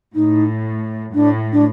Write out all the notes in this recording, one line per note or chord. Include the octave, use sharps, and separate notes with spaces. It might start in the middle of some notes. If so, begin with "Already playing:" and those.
A2 D#4
A2 D4
D4